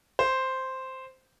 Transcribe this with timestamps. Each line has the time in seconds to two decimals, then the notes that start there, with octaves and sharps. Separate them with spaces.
0.19 C5